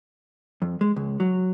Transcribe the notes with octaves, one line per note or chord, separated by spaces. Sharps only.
F2
G#3
C#2
F#3